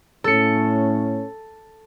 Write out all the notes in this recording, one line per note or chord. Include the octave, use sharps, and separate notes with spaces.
A2 C#4 A4 C#7